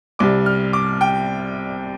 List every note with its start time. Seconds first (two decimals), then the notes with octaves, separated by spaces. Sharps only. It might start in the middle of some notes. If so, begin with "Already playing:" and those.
0.19 C2 C3 G3 D6
0.46 F6
0.73 D6
1.01 G5